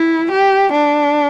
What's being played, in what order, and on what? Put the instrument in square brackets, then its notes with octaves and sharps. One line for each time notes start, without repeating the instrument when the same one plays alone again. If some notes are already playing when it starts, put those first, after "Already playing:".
Already playing: [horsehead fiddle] E4
G4
D4